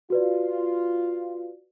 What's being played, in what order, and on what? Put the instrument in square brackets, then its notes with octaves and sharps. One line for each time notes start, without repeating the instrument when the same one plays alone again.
[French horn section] F4 [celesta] F#4 B4 D5